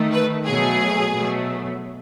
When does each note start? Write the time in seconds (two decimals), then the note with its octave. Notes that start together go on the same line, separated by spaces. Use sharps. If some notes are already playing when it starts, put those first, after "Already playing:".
Already playing: D#3 A3
0.13 B4
0.46 B2 F#3 A3 G#4
1.14 B2 F#3 A3